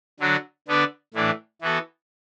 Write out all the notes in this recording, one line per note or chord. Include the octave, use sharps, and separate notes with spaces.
D3 F#3 D4 F#4
D3 B3 D4 B4 D5
A2 E3 A3 D4
E3 B3 F#4 A4